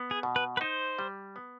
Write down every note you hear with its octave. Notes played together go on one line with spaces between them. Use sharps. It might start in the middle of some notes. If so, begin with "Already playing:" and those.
Already playing: B3
G#4
B2
B4
B4
D#4 C5
G3
B3